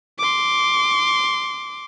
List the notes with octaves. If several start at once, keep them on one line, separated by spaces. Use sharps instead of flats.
C6 D6